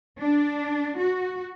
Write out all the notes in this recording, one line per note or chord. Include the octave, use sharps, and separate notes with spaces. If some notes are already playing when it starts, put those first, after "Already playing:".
D4
F#4